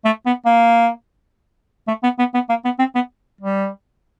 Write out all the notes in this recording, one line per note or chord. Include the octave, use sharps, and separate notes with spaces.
A3
B3
A#3
A3
B3
B3
B3
A#3
B3
C4
B3
G3